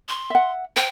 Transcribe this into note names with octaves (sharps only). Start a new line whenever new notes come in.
C6
E5 F#5
C5 G5